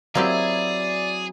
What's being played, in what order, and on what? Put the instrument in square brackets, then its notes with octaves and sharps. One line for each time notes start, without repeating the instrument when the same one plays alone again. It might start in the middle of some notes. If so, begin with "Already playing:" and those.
[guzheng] F#3 E4 [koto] A#3 C4 G4 [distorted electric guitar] G#4 [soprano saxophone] D5